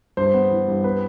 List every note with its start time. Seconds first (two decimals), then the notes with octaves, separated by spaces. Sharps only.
0.17 G2 C5
0.34 B3
0.51 E3
0.68 G2
0.84 B3 B4